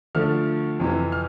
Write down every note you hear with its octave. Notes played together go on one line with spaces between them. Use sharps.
D2 D3 F3 A3 F6
F2 C3 E3
F6